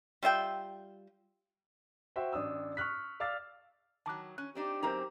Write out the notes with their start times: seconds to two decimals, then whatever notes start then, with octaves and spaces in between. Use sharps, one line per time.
0.23 G3 F4 E5 G5
2.16 F#4 C5 E5 G5
2.33 A1 D4 D#6 E6
2.77 C#6 D#6 F6 F#6 B6
3.20 D5 F5 D6 E6 F6 A6
4.06 D#3 F#3 A5 D6 F#6
4.38 C#4 F#6
4.55 C4 D4 D#4 G4
4.83 F#2 C4 D#4 A#4 C5 A#5